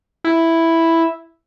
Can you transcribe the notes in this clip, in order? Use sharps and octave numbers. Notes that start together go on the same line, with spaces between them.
E4